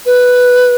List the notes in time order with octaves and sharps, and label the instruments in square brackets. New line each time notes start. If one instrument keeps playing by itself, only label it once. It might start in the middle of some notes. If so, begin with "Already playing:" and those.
[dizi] B4